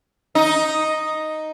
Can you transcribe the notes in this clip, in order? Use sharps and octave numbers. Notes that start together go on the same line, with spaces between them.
D#4